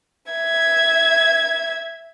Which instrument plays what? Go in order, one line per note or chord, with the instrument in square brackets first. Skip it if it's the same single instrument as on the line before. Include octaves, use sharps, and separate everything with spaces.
[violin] E5 G#6